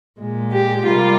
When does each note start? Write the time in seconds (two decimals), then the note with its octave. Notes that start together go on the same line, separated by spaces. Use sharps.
0.19 A#2 G#3
0.53 G4
0.86 C3 G3 A#3 F4